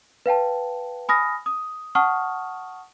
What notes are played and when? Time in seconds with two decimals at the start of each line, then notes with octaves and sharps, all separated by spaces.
0.26 B4 F5 G5 A5
1.09 G#5 B5 D#6 F6 A#6
1.46 D#6
1.95 F#5 A5 C#6 D#6 F6